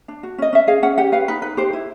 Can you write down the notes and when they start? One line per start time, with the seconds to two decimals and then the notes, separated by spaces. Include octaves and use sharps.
0.08 D4
0.23 F#4
0.38 C#4 D#5
0.53 C#4 E5
0.67 G#4 F5
0.83 C#4 F#5
0.98 G4 F#5
1.12 B4 F5
1.28 D#4 B4
1.42 D#4 B4
1.57 G4 C5
1.73 E4